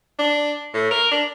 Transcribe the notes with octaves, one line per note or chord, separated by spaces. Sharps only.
D4
A2
A#4
D4